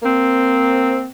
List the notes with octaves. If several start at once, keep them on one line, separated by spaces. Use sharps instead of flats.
A#3 C4